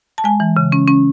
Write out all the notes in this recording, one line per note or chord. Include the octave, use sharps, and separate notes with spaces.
A5
G#3 G#5
E3
C#3
C#4
C#4